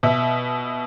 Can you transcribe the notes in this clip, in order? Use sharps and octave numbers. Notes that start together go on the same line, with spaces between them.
B2 E5